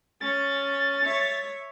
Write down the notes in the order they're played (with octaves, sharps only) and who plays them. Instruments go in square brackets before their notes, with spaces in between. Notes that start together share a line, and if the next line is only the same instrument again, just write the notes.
[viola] C#4 [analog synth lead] A6
[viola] C#5 E5